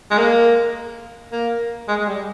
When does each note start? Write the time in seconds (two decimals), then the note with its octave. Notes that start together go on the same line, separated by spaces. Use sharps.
0.11 G#3
0.18 A#3
1.32 A#3
1.88 G#3
2.00 G#3
2.08 G3